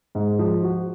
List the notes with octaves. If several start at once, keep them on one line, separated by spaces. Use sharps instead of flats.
G#2
F3
F#4